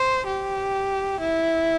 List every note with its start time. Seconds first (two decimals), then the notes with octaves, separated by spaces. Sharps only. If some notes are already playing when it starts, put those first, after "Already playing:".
Already playing: C5
0.27 G4
1.20 E4